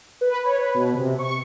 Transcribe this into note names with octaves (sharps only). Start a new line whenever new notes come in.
B4
C#5
B4
B2
C3
C#6